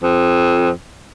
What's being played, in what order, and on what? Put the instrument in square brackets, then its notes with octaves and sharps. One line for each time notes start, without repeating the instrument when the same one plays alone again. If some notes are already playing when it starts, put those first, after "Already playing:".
[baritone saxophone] F2